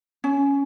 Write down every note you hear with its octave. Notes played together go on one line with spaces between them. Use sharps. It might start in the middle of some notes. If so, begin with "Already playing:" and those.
C#4